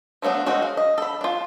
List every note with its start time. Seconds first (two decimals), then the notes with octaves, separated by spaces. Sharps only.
0.22 F3 F#3 A3 B3 D4
0.46 D#3 G#3 A3 C4 F#4
0.62 F5
0.77 D#5
0.98 A4 B5
1.21 D4 F4